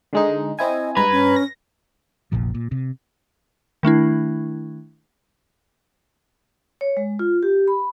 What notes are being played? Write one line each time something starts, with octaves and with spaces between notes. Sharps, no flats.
D3 G#3 D#4
C4 E4 D#5 G#5
G2 G#3 B4 A#5 G#6
C#4
A#6
F1 A#1 A#2 F3
A#2
C3
D#3 A3 D4 E4
C#5
G#3
F4
G4
B5